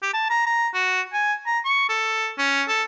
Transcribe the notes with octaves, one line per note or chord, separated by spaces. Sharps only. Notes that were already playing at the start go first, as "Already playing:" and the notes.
G4
A5
A#5
A#5
F#4
G#5
A#5
C#6
A4
C#4
A4